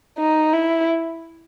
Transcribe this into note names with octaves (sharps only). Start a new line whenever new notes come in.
D#4
E4